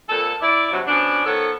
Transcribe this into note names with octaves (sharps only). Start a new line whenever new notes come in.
F2 A#2 A4
E4 D5
G2 C3 F#3
B2 F3 C#4 D4
D#3 F3 B3 A4 C#5